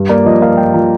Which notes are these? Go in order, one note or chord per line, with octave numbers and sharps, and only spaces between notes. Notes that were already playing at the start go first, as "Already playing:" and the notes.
Already playing: G2
A#3 D5
F3 D#5
A#3 F5
G2 G5
F3 A#5